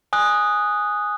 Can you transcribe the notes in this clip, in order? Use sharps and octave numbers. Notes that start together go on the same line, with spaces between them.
G#5 D#6 F#6